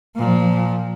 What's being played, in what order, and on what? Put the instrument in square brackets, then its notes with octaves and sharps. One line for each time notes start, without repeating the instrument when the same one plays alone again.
[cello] A#2 F3